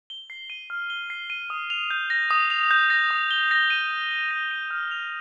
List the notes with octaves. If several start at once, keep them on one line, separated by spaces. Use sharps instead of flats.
G7
C7
D#7
F6
G7
C7
D#7
D#6
F7
G6
A#6
D#6
F7
G6
A#6
D#6
G7
A#6
D#7
D#6
G7
A#6
D#7
F6
F7